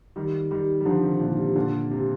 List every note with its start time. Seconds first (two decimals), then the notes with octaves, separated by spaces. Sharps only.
0.16 D#3 G3
0.51 D#3 G3
0.81 G3
0.85 D3 F3
1.03 C3 D#3
1.21 A#2 D3
1.38 C3
1.56 A#2 D3
1.91 C3